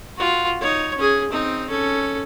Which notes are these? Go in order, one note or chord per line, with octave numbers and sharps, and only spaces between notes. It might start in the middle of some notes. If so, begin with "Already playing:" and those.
F4 F#4
D#4 C#5
C#4 G#4
C4 D#4
C#4 A4